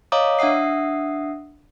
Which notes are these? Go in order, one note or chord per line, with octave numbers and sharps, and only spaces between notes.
C#5 D#5 F5 A#5 D6 D#6
D4 E5 F#5 D#6 C7